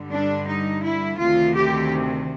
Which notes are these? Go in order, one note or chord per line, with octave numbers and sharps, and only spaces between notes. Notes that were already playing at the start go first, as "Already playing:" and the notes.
Already playing: G2 D3 G3
D4
D#4
E4
D2 C3 D#3 F4
G4